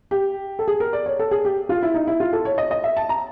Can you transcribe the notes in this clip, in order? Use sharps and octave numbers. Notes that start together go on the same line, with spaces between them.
G4
A4
G#4
A#4
D5
C#5
A4
G#4
G4
F4
E4
D#4
E4
F4
A4
C#5
D#5
D#5
E5
A5
A#5